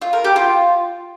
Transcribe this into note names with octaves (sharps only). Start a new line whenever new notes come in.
F4
A#4
G4
F4